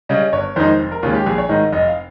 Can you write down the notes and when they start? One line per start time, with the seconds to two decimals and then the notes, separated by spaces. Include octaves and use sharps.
0.09 C#3 G3 C#4 D#5
0.33 G1 C#5
0.56 F2 D#3 G#3 D#4 C5
0.79 F1
0.91 A#4
1.03 D#2 C#3 G#3 F4
1.14 G4
1.26 A#1 G#4
1.38 C#5
1.49 G#2 D#3 D#5
1.72 F1 D#5
1.88 F5